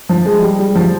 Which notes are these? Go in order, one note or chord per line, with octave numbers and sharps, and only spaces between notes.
F3
G#3
G3
G3
F3